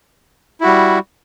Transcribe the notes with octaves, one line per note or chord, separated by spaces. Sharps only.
G3 E4 F#4